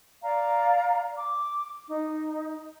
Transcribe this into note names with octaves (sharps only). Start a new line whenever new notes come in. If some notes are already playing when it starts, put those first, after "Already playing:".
D5 F5 A#5
D6
D#4